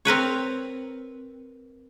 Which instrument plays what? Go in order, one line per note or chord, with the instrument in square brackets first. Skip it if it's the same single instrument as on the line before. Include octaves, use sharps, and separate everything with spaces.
[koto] C4 A#4 B4 C#5